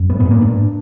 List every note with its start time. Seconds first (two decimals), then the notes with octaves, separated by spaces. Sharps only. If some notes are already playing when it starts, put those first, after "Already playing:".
Already playing: F#2
0.10 G#2 B3
0.20 B3
0.25 G#2
0.31 A#3
0.41 G#2 D4